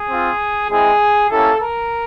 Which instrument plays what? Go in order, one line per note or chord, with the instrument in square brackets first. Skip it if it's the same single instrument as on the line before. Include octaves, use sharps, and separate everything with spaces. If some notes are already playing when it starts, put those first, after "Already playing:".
Already playing: [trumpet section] G#4
C4 F4
G#3 C4 E4 G#4
A#3 C#4 E4 G4 A4
A#4